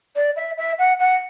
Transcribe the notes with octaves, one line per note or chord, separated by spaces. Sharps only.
D5
E5
E5
F#5
F#5